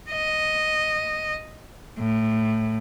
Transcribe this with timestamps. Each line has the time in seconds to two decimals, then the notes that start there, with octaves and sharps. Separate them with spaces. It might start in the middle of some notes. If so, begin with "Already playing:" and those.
0.11 D#5
1.99 A2